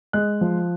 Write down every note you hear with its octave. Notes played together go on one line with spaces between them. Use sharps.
G#3 F#6
F3